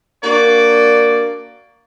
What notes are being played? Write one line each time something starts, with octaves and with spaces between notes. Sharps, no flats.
A#3 D4 F#4 D5